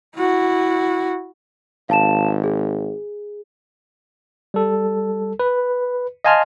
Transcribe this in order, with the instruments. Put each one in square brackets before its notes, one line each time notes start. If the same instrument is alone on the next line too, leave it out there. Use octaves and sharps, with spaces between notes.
[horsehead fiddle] E4 F#4
[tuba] G#1 [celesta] F5 A5 E7
[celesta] G#4
[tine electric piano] G3 A4
B4
D#5 F5 G#5 A5 C6 F6